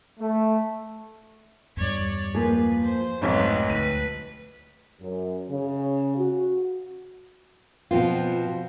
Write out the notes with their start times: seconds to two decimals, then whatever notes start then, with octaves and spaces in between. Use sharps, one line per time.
0.19 A3
1.77 E2 G2 G3 C#5 D5
2.35 F3 A#3 G#4 B4
2.84 C5
3.22 B1 F2 G#2 F#3 A3 B3 G#4 C#5
3.70 D2 B4 D#7
5.00 F#2
5.49 C#3
6.17 F#4
7.91 B2 F3 C4 F4